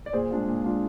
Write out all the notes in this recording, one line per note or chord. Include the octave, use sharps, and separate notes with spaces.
D5
A#2 G#4 C5
G#3 D4 F4
A#2
G#3 D4 F4